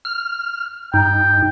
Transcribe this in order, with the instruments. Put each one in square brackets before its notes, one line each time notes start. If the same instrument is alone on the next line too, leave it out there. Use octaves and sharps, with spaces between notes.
[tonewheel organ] F6
[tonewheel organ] G2 D#4 [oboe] G5